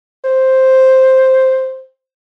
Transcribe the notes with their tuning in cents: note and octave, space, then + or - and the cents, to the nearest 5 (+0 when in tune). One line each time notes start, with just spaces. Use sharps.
C5 +0